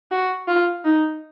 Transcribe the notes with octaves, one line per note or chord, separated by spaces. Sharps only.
F#4
F4
D#4